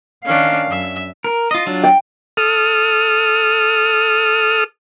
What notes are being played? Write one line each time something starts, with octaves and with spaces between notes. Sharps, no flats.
D#3 C#4 D4 F5
F#2 E5
A#4
F4 D#5
F#3 D4 F4
G5
A4 D#6 F6